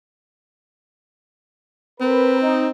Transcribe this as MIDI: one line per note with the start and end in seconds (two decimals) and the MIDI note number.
2.01 2.70 60
2.01 2.36 70
2.01 2.36 71
2.41 2.67 63